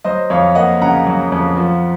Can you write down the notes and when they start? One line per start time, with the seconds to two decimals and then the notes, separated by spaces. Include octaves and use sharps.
0.04 F#3 C5 D#5
0.30 F2 C#5 F5
0.55 A#3 D#5 F#5
0.82 C#3 F#5 A#5
1.07 F#3
1.32 F2
1.57 F3